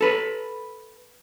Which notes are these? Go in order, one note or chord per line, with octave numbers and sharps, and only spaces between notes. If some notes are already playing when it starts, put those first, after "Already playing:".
A4 B4